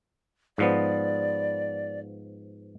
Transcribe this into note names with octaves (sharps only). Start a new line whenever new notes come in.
G#2 F3 B3 D5